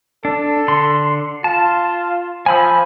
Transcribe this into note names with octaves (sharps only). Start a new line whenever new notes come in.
D4 A4
D3 C6
F4 A5
F3 G#5 B5 E6